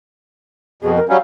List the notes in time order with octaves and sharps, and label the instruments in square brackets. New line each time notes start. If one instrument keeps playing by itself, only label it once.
[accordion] F2 B2 [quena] G#4
[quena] A#4
[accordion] F#3 G3 C#4 [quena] F5